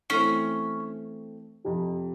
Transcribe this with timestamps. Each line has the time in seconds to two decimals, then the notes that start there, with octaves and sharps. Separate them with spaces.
0.10 E3 A3 C4 C#4
1.64 F2 C3 F3